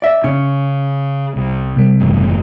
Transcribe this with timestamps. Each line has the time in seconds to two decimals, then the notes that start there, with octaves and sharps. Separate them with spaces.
0.02 D5 E5
0.24 C#3 C#4
1.36 C2
1.76 C3 G3
2.00 F#1 E2 A2